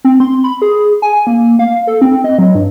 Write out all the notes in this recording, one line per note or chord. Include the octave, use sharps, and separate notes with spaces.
C4
C6
B5
G#4
G#5
A#3
F5
A4
C4
D#5
F#3
G2